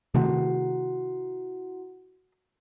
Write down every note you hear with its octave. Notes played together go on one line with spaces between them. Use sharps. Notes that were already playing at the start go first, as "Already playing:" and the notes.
C3 D#3 A3 E4 F#4 F#5